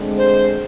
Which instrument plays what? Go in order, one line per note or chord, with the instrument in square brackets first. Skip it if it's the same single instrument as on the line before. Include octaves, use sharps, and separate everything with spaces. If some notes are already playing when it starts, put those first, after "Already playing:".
Already playing: [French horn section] D2 D3 G#3 C4
[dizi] C5